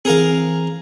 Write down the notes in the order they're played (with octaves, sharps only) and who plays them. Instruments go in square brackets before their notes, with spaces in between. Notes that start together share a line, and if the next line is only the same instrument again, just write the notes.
[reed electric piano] E3 C4 [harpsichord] G#4 A#4 F5